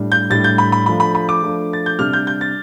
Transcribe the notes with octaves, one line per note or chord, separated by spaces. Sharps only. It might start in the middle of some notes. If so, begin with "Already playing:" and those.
Already playing: A2 G3 D4
G6
A2 G3 D4 A6
G6
B5
B5
F3 A3 D4 B5
B5
B5
D6
F3 A3 D4
A6
G6
C3 G3 D4 F6
G6
G6
A6